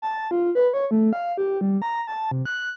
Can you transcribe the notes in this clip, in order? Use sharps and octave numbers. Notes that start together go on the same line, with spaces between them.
A5
F4
B4
C#5
A3
F5
G4
G3
A#5
A5
C3
F#6